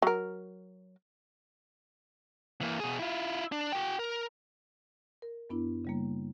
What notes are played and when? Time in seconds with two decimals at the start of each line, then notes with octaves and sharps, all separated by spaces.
0.02 F#3 A#4
2.61 E3 A#3
2.80 B2 G#4
2.99 E4 F4
3.52 D4
3.72 F#4 G5
3.99 A#4
5.22 A#4
5.50 F#2 B3 D4 E4
5.85 C#3 G3 A#3